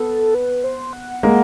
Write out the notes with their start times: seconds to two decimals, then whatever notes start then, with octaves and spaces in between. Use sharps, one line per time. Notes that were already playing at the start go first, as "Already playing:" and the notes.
Already playing: B3 A4
0.34 B4
0.64 C5
0.93 F#5
1.23 G#3 A#3